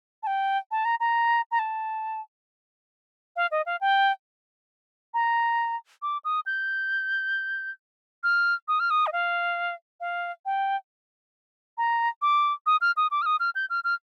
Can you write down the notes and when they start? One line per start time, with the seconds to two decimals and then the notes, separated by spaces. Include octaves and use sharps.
0.23 A5
0.27 G5
0.71 A5
0.85 A#5
1.00 A#5
1.51 A#5
1.59 A5
3.36 F5
3.51 D#5
3.66 F5
3.81 G5
5.14 A#5
6.02 D6
6.25 D#6
6.46 G6
8.23 F6
8.68 D#6
8.80 F6
8.90 D#6
9.07 D#5
9.13 F5
10.01 F5
10.46 G5
11.78 A#5
12.22 D6
12.66 D#6
12.81 F6
12.97 D#6
13.11 D6
13.22 F6
13.26 D#6
13.40 F6
13.55 G6
13.70 F6
13.84 F6